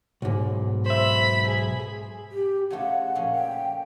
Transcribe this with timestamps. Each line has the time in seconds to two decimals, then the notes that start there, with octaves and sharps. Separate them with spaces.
0.22 B1 G#2
0.86 C5 E5 B5
1.48 G#4
2.32 G4
2.71 C#3 A3 F4 F#5
3.15 A#2 F3 C#4
3.35 G5